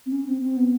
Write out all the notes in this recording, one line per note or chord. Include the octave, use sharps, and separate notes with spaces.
C4
C#4
C4
C4
B3